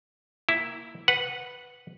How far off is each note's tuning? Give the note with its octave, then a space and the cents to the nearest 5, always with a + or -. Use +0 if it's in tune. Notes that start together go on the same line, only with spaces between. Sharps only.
A#3 +0 E4 +0
B4 +0 F#5 -10